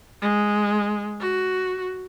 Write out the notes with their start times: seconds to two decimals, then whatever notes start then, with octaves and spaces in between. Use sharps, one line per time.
0.22 G#3
1.20 F#4